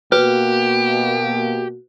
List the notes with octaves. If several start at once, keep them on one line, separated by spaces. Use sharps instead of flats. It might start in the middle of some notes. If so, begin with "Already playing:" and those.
B2 A#3 F#4 G4 B4